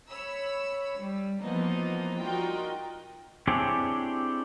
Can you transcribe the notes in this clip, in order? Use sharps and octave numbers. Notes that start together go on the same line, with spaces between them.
C#5 B5 E6
G3
E3 F3 A#3 B3 D#4
G3 D#4 F4 F#4 A#4 G5
C4 D4 E4 G4 G#4 C#5